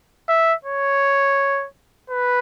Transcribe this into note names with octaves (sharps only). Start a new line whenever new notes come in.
E5
C#5
B4